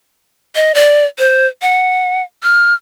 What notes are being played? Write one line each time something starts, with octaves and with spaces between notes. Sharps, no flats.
D#5
D5
C5
F#5
F6